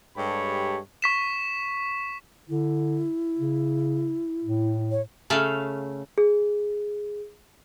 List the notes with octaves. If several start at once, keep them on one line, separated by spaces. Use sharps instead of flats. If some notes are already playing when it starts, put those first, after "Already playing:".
G2 G#3 G4 A4 C#5 B5
C#6 B6 E7
D3 E4
C#3
A2
C#5
C#3 A3 F5
G#4